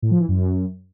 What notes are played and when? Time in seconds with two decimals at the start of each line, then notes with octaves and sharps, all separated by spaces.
0.02 A2
0.11 F3
0.20 E3
0.28 F#2